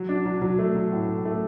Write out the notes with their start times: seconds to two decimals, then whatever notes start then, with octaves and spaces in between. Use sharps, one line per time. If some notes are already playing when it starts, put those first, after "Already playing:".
Already playing: F#3
0.09 D4
0.25 F#3
0.42 F#3
0.59 A3
0.75 F#3
0.92 A2
1.09 A2
1.25 A3